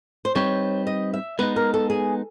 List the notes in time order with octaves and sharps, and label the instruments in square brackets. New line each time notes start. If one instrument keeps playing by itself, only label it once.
[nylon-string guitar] C5
[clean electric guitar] G3 C4 D#4 G4 B4 [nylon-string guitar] C#5
[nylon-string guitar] D#5
E5
[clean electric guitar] G#3 B3 D#4 [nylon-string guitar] B4
[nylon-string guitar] A#4
A4
G#4